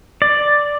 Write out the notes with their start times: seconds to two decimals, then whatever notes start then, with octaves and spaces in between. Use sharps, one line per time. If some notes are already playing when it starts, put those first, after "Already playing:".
0.22 D5